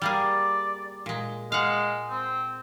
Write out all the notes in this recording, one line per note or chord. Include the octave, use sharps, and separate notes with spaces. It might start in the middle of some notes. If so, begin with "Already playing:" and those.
G3 A#3 G#4 D5
A#2 G#3
G#3 F5 F#5
C4